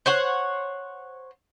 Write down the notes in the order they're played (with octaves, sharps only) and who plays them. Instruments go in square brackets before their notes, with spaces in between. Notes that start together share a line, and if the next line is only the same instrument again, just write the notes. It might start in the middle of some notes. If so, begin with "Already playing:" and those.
[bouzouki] C5 C#5 F#5